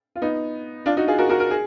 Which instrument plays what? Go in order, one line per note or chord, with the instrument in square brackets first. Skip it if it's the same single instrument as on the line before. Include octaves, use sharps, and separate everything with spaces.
[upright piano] F4
B3 D#4
D4 F4
D#4 F#4
F4 G#4
F#4 A#4
F#4 A#4
A#4
G#4